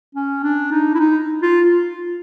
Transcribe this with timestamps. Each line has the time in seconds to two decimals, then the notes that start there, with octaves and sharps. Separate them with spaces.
0.15 C#4
0.44 D4
0.72 D#4
0.95 E4
1.00 D#4
1.43 F4